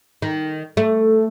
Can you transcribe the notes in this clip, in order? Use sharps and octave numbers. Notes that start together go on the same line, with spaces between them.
D#3
A3